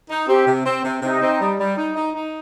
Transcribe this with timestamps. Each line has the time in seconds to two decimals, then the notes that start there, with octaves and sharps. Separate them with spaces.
0.09 D#4
0.27 C4 G4
0.46 C3
0.65 C4
0.84 C3
1.02 C3 D#4
1.21 C4
1.40 G3
1.59 G3
1.77 D#4
1.95 D#4
2.14 D#4